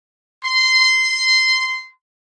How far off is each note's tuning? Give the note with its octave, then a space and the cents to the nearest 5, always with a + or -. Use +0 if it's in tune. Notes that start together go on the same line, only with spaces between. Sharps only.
C6 -15